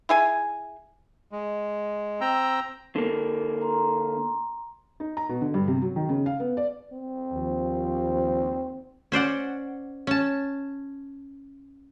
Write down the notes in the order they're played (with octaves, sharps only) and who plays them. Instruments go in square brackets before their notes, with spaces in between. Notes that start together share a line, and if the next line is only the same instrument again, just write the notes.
[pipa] E4 G#4 G#5
[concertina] G#3
C4 G5 A#5 E6
[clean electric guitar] D3 A#3
[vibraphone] A#5 C6
[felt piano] D#4
A#5
B2
D3
G2
C3
F#3
D#3
C#3
F5
B3
D5
[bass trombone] C4
[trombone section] D#2 F3
[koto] C#4 C5 D5 F#5
C#4 A5